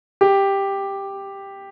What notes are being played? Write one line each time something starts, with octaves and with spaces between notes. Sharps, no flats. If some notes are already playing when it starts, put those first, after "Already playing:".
G4